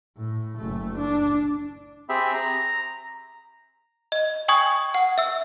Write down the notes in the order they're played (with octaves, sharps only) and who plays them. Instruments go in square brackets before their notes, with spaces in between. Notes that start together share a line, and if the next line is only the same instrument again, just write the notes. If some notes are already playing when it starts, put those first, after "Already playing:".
[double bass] A2
F#1 A3
D4
[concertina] C4 G4 G#4 E5 B5
A#5
[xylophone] D#5
G5 G#5 C#6 D#6 G#6
F#5
E5 E6